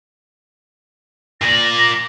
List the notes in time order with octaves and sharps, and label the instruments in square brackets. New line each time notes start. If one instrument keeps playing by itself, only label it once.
[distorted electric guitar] A#2 D5 [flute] A#6